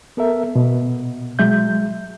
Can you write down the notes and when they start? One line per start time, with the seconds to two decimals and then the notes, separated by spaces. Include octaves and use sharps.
0.17 B3 A4 A#4 E5
0.56 B2
1.39 F#3 G#3 E5 G6